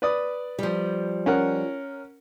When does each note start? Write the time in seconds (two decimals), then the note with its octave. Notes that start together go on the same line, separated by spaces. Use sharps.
0.02 B4 D5 D#6
0.59 F3 G3
1.26 C#4 A#4 F#5